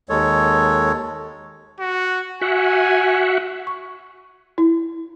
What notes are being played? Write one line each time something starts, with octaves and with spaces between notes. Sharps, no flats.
D#2 G#3 A4 C#5
F#4
F#4 E5 F#5 G#5
C#6
E4